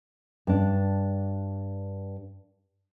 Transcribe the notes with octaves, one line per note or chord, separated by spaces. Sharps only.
G2 D4